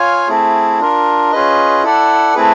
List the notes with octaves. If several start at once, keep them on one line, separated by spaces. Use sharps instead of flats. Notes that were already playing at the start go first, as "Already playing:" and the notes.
Already playing: F4 C#5 F5 G#5
A3 C4 E4 G#4
D4 F4 A#4
C#4 F4 G#4 B4 D#5
E4 A4 D5 F#5
A3 C4 E4 G#4 B4